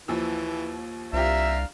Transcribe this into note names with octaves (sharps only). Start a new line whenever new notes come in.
D#2 E3 F3 E6
C2 C4 D4 F4 G4 E5 F5 A#5